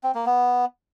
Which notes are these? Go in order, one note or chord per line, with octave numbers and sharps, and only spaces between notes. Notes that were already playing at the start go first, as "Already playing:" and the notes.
C4
A#3
B3